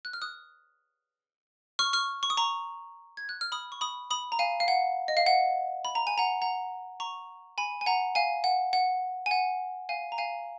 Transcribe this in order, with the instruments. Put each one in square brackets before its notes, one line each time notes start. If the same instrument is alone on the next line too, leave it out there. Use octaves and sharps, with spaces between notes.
[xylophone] F#6
F6
D#6 F#6
C#6 F6
C#6 F6
C#6
D#6
A#5 C#6
G#6
F#6
F6
B5 D#6
C#6
B5 D#6
B5 D#6
A#5
F5 G#5
F5
F#5
D#5
F5
F#5
B5
A#5
G#5
F#5 A#5
F#5 A#5
A#5 C#6
G#5 B5
G#5
F#5 A#5
F5 G#5
F#5
F#5
G#5
F#5
F5 G#5
A#5
F5 G#5